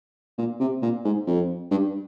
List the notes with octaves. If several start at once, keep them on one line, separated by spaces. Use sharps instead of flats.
A#2
C3
A#2
G#2
F2
G2